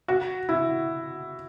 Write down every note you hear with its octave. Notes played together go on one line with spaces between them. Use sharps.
F#4
E4